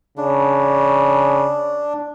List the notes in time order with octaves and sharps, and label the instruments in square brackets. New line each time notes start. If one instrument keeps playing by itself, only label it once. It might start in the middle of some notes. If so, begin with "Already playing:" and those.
[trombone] C#3 [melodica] D4